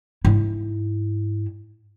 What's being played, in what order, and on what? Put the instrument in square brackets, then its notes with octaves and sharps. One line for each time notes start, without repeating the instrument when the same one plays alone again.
[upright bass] G#2 E4